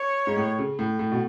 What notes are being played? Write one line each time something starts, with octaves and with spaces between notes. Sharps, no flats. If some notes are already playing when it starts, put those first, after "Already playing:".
Already playing: C#5
G#2
A2
C#3
A2
A2
B2